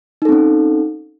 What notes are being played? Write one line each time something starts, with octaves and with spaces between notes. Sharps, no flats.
C4 C#4 D#4 A4